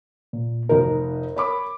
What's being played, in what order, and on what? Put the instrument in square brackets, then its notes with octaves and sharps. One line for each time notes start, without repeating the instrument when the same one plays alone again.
[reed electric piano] A#2
[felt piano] F1 D#4 [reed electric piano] A#4
[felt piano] C#5 B5 D6